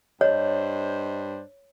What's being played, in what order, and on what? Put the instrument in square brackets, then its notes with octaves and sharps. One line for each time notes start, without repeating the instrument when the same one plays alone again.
[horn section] G2 D4 C5 [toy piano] C#5 [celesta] D#5